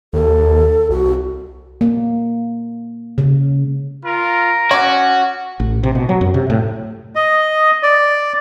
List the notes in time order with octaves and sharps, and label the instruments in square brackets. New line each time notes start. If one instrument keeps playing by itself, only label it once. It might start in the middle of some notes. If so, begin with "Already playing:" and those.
[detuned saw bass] D#2 [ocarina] A4
[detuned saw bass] C2 [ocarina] F#4
[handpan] A#3
C#3
[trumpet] F4 [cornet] A#4
[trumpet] C#4 [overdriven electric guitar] F#4 [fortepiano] C#5 D6
[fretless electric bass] A1
C3
B2
F#3
F#2
C3
A2
[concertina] D#5
D5